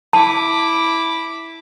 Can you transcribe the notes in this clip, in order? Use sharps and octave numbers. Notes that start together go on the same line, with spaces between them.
E4 A5 D6